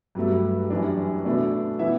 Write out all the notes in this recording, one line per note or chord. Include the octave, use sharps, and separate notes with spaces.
G2 F#3 A3
F#2 E3 G3 D4
B2 A3 D4
E3 B3 E4 E5